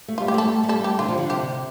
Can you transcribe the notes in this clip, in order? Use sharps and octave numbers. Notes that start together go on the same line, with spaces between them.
A3
G3 F4
G4
A3 A4
A3
G3 A4
G4
D3 F4
F3
D3
C3 G4